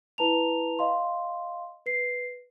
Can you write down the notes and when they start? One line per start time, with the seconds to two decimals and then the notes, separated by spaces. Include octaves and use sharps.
0.18 E4 B4 A5 A#5 F7
0.79 D#5 F5 C6
1.86 B4 C7